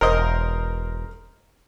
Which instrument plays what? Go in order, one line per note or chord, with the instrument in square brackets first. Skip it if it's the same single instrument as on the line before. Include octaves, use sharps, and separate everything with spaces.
[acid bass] E1 [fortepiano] A#4 C5 D#5